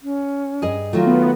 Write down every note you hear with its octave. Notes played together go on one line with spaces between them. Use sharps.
C#4
G2 G#4 D#5
D#3 F#3 A3 F4
B3